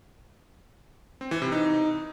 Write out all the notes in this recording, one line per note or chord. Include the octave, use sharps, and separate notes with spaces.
C4
E3
C3
D#4